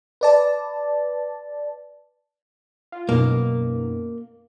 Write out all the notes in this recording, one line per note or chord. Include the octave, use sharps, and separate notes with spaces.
B4 D5 A5
F4
F#2 B2 A#3 D#4